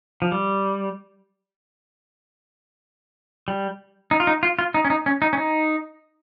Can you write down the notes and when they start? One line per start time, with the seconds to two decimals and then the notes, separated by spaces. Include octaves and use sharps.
0.22 F3
0.32 G3
3.48 G3
4.11 D#4
4.20 F4
4.27 D#4
4.43 F4
4.59 F4
4.74 D#4
4.85 C#4
4.90 D#4
5.06 C#4
5.22 D#4
5.33 C#4
5.37 D#4